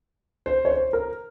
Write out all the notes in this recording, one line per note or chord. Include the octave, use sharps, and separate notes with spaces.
C5
C#5
C5
A#4